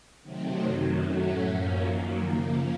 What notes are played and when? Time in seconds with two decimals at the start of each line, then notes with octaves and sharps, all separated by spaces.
0.22 C3 D#3 F#3 A3 C4
0.62 F#2 D#3 F#3
1.02 A2 F#3 A3 C#4 F#4
1.42 F#2 F3 A#3 C#4
1.81 F#2 D#3 F#3 A#3
2.21 C#3 F3 A#3